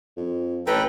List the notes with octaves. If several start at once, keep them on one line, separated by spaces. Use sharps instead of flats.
F2
A1 A4 B4 G5 A#5